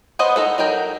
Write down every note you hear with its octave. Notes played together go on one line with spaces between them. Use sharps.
B3 C5 D#5 F#5
D#4 A4 F#5
F#3 D#4 A#4 G5